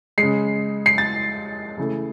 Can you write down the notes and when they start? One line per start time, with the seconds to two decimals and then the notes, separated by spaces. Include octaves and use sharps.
0.18 C#3 G#3 C7
0.86 C7
0.98 A6
1.77 C#3 E3 A3